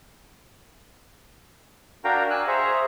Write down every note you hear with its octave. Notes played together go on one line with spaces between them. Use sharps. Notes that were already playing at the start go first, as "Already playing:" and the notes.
D4 F#4 A#4 F5 G5 A#5
G#5 E6 F#6
G#4 C5 E5 A#5 C#6